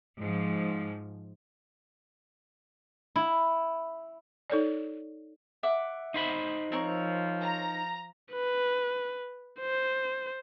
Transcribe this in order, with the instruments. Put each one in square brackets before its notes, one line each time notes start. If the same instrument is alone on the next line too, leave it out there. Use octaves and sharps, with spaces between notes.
[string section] G#2 F3
[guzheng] E4
[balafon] D#4 A4 C#5 D5
[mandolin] E5 F#5 D6
[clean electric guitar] D#4 C5 B5
[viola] F3 [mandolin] C4 A#4 C#5
[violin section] A#5
[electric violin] B4
C5